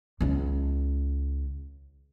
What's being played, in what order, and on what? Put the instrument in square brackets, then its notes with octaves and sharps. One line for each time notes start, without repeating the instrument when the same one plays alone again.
[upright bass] C#2 C#3